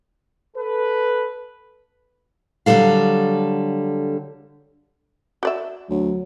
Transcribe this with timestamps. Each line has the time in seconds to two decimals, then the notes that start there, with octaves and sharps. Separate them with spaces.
0.57 A4 B4
2.66 D3 F#3 G3 A4 F5
5.43 F#4 D5 E5
5.90 D2 F#3